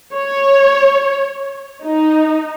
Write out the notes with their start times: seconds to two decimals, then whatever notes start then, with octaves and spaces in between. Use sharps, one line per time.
0.14 C#5
1.83 D#4